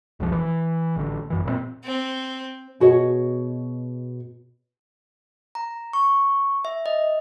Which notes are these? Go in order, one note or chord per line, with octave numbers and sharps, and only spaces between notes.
E1 C2 F2 F3
E3
A1 D3
G1 F#2 E3
A#2 D3 C4
C4
B2 F#4 G#4 C#5 D#5
A#5
C#6
E5
D#5